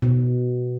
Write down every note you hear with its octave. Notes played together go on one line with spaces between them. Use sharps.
B2